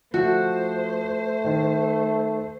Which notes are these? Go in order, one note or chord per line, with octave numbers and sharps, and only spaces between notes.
F3 A3 F#4 C5
D#3